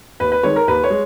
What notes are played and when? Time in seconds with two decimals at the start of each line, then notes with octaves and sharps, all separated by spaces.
0.20 D#2 B4
0.32 B4
0.43 D#3 G#3 C#5
0.56 A#4
0.68 D#2 B4
0.84 C#5
0.90 G#3